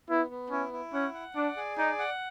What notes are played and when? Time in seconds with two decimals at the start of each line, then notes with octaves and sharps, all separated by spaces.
0.09 B3 E4
0.30 B3
0.51 C#4 E4
0.73 E4
0.93 C#4 F#5
1.14 F#5
1.35 D4 D5
1.57 G#4
1.78 D#4 D5
1.99 F#5